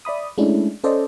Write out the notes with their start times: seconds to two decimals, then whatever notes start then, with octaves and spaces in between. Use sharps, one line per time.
0.05 D5 E5 B5 D#6
0.38 G#3 A3 C#4 D4 E4
0.84 C#4 A4 C5 D5 D#5